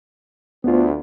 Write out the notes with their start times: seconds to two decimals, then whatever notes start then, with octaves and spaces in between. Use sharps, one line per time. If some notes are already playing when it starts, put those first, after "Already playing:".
0.64 D2 B3 C4 F4